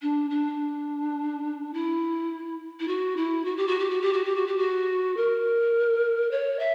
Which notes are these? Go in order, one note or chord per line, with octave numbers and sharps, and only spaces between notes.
D4
D4
E4
E4
F#4
E4
F#4
G4
F#4
G4
F#4
G4
F#4
G4
F#4
G4
F#4
A#4
C#5
E5